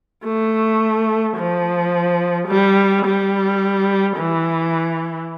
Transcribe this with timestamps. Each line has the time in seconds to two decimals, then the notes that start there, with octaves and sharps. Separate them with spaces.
0.24 A3
1.37 F3
2.48 G3
3.05 G3
4.17 E3